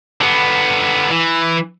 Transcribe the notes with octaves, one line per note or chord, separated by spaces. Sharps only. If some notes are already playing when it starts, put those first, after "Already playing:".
D3 B3
E3